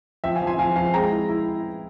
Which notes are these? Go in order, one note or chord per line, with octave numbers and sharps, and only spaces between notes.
F3 E5 G5
F5 G#5
F3
G#5 C6
F3 F5 G#5
F3 F5 G#5
G#3 G5 A#5
E4
E4